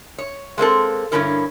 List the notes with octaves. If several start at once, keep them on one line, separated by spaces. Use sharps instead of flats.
C#5
G#3 A#3 C4 A4
G2 D3 G#3 C#4 E4 A#4